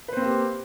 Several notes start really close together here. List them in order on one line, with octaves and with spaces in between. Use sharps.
B4 C5 C4 A#3 G4